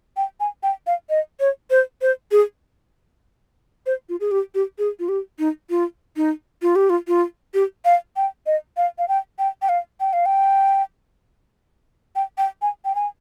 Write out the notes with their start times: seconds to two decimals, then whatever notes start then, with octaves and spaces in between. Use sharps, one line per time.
0.17 G5
0.40 G#5
0.63 G5
0.87 F5
1.10 D#5
1.40 C#5
1.70 C5
2.02 C5
2.32 G#4
3.86 C5
4.09 F4
4.20 G#4
4.31 G4
4.55 G4
4.79 G#4
4.99 F4
5.09 G4
5.39 D#4
5.70 F4
6.17 D#4
6.62 F4
6.76 G4
6.90 F4
7.08 F4
7.54 G4
7.85 F5
8.16 G5
8.46 D#5
8.77 F5
8.98 F5
9.08 G5
9.39 G5
9.62 G5
9.69 F5
10.00 G5
10.13 F5
10.26 G5
12.16 G5
12.38 G5
12.62 G#5
12.85 G5
12.95 G#5